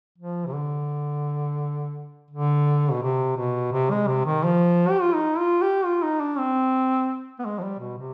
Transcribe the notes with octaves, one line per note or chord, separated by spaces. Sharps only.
F3
C3
D3
D3
B2
C3
B2
C3
G#3
C3
D#3
F3
G4
F4
D#4
F4
G4
F4
D#4
D4
C4
B3
G#3
F3
G3
B2
C3